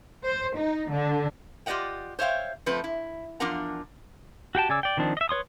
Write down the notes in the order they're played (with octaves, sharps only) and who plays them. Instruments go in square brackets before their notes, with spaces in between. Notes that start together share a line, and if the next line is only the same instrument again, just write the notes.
[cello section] C5
D#4
D3
[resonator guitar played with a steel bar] F4 G4 D5 D#5 F#5 G5
C5 C#5 E5 F5 G5
F3 A3 C4 B4
E4
E2 F3 D4 F4 A#4 F#5
[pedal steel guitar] F#4 G4 G5 A5
C#3 D5 G#5 D6 E6
D5 G5
D#3 F3 C4 D4 D#4
D#5 E5
B4 C#5 C6 D#6